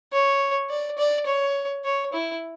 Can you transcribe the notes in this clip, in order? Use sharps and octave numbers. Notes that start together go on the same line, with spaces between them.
C#5
D5
D5
C#5
C#5
E4